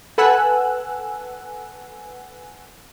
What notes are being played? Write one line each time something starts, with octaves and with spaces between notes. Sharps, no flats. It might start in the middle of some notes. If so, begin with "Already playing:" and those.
A4 B4 F#5 G#5 E6 F#6